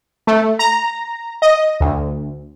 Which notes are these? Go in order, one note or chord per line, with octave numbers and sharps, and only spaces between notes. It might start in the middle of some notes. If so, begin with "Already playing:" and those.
A3
A#5
D#5
D2